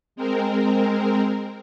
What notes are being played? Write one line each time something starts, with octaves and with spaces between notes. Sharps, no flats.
G#3 C4 A#4